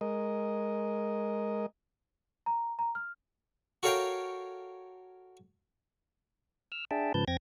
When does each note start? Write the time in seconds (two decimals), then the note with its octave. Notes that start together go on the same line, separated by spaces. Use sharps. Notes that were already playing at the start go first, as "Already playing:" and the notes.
0.01 G#3 A#4 D#5
2.46 A#5
2.79 A#5
2.95 F6
3.83 F#4 A4 A#4 C#5 F5 G5
6.72 E6 F6
6.91 D4 G#4 E5 G5 A5
7.14 G#2 C#3 F3 B4 A5 G6
7.28 F2 C4 G5 G#6 A#6